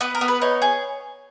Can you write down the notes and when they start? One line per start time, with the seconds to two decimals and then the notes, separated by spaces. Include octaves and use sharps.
0.01 B3 B4
0.15 A#4
0.21 B3
0.28 B4
0.41 D#4 C#5
0.62 G#4